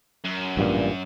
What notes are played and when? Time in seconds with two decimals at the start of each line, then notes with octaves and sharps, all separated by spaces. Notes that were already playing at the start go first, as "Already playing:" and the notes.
0.24 F#2
0.57 A1 G2 A#2